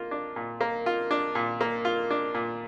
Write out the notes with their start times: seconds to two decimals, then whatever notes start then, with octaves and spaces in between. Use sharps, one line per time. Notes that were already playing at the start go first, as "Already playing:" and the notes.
Already playing: A#3 F4
0.11 D4
0.36 A#2
0.61 A#3
0.86 F4
1.11 D4
1.35 A#2
1.61 A#3
1.85 F4
2.11 D4
2.34 A#2